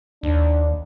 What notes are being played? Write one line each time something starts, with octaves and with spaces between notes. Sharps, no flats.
D#2 D4